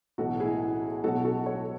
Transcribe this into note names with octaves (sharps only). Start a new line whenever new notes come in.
B1 A2 E3 F#4 A4
E4 G#4
B1 B2 F#3 F#4 A4
F#4 A4
A4 C#5